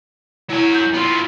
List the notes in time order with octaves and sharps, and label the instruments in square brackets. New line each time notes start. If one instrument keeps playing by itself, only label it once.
[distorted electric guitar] F#3 G#5 [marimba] E4
[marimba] G6
[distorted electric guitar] B3 F4